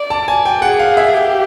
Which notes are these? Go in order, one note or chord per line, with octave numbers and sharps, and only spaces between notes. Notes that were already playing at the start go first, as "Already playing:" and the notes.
Already playing: D5
A5
G#5
G5
G#4 F#5
F5
E5
G4